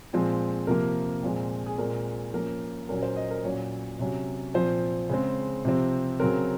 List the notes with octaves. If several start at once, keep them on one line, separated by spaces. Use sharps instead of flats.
A#2 F3 G#3 C4
C3 F3 A#3 A#4
A#2 F3 G#3 C4
G#4
A#2 G#3 C4 A#4
F3 A#3 C#4 A#4
A#2 F#3 C#4 A#4
C5
D#5
A#4
A#2 F#3 C#4 C#5
C3 F#3 C#4
A#2 F3 C4 C5
C#3 G#3 C4
C3 F3 C4
C#3 F#3 C4 A#4